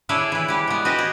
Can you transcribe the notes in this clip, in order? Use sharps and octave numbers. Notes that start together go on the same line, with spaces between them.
D4 E4 G#4 A4 C#5 D5
E3 B4
G3 G4
G#3 B3
F#4 G4 B4 D#5
G#4